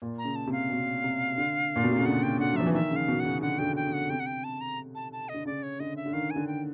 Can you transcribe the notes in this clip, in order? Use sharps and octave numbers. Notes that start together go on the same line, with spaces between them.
A#2
A#5
C#3
A5
C3 F5
B2
C3
D3
A#2
B2
C3
C#3
D3 F#5
G5
D3 F#5
F#3
F3 E5
E3
D#3 E5
C#3
F5
B2
F#5
C#3
D3 F#5
D3 G5
C#3
G5
C#3
F#5
C3 G5
F#5
G5
A5
A#5
A5
A5
D#5
D3
C#3 D5
C#5
D3 D#5
E5
D3
D#3 F5
G#5
D3
G5